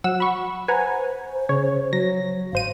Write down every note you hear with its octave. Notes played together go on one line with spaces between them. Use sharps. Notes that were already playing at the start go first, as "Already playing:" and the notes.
F#3 F#5 E6
B5 C#6
B4 C5 F#5 G#5 A#5
C#3 C#5
F#3 A#6
G#1 C5 F5 D#7